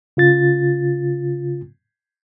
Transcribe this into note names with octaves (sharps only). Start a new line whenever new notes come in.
C#3 F4 A6